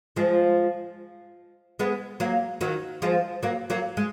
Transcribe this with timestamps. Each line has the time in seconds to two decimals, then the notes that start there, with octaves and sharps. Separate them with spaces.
0.16 F3 G#3
1.79 G#3 B3
2.20 F#3 A#3
2.61 D#3 F#3
3.02 F3 G#3
3.43 F#3 A#3
3.70 F#3 A#3
3.97 G#3